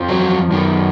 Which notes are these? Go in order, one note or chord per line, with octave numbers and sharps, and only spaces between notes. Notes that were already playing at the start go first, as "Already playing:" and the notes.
Already playing: F2 F3
F#3
F#2 D#3